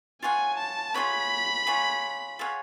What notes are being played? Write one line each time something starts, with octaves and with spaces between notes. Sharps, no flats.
F4 G#4 C#5 F#5 G#5
A5
F4 G#4 C#5 F#5 B5
F4 G#4 C#5 F#5
F4 G#4 C#5 F#5